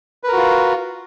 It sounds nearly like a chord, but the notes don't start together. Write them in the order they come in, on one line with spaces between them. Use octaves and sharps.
B4 A#4 F#4 F4